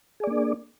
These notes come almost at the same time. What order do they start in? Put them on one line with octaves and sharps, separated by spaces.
G#4 D5 A#3 D4